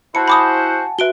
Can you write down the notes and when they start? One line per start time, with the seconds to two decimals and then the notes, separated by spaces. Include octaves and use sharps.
0.15 E4 F#4 C5 F#5 A5 B5 C#7
0.28 F#5 G#5 A5 B5 D6 D#6
0.99 F#4 B4 E5 D7 G7